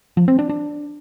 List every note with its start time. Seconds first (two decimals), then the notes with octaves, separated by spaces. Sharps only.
0.17 F3
0.28 C4
0.39 D4
0.49 D4